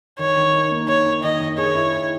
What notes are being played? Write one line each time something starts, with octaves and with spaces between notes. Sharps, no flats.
D#3 C#5
D#3
D#4
A#3
D#3 C#5
D#4
D#3 D#5
D#3
G#4 C#5
E4
E4